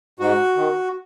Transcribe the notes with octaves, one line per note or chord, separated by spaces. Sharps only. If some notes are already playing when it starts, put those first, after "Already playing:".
G#2 F#4
D#3